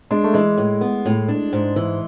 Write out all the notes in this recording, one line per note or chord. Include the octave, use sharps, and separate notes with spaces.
G#3 D4
A3
E3 G#3
A2
B3
A2
D4
G#2
E3